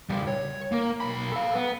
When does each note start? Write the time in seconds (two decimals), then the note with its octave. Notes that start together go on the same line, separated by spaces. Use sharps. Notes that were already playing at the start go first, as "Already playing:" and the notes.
0.10 C#3 G3
0.27 C#5
0.72 A#3 A#4
1.00 B1 B5
1.32 A4 F5
1.55 B3